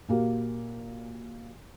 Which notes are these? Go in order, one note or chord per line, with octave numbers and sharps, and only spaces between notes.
A#2 A#3 F#4 G4 A#4